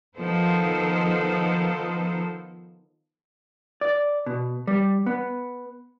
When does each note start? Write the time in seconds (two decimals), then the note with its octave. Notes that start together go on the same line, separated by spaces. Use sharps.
0.17 D#3 F3 B3 D#4 A4 C5
3.81 D5
4.26 B2
4.67 G3
5.06 B3